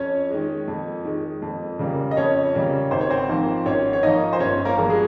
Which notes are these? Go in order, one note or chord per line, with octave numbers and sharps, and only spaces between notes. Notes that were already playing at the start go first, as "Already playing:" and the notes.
Already playing: F2 C#4 C#5
D#3 G#3
F2
D#3 G#3
F2
C#3 G3 A#3
D#5
F2 C#4 C#5
C#3 G3 A#3
G#1 C5
C#5
C4 C5
G#2 F3 A#3
G#1 C#4 C#5
C#5
G#2 F3 A#3 D#4 D#5
C5
G1 C#4 C#5
A#3 A#4
G2 F3 G#3
G#3 G#4